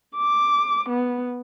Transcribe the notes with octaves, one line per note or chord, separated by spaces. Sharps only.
D6
B3